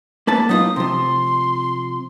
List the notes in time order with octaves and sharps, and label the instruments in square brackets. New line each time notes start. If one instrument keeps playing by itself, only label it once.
[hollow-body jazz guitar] A#3 B4 A5
[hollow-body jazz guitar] F#3 D#4 F4 [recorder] D#6
[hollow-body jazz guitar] C3 F3 [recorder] C6